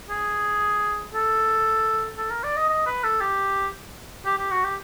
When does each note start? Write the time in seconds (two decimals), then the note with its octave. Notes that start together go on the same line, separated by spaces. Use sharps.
0.10 G#4
1.14 A4
2.18 A4
2.30 A#4
2.44 D5
2.57 D#5
2.69 D#5
2.86 B4
3.04 A4
3.21 G4
4.26 G4
4.38 G4
4.51 F#4
4.64 G4